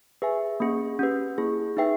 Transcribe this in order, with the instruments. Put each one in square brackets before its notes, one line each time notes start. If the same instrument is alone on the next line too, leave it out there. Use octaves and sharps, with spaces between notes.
[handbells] G#4 B4 E5 G#5
A#3 C#4 G#4
C#4 G4 B4
A#3 E4 G#4
D#4 G#4 B4 E5 G5